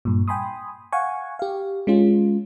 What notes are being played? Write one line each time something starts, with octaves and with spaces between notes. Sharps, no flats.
G2 A#2
G5 G#5 B5 C6 D#6
F5 F#5 G#5 C#6
G4 F5
G#3 C#4 F4